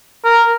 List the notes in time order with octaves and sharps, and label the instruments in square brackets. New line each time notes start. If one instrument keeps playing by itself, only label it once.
[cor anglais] A#4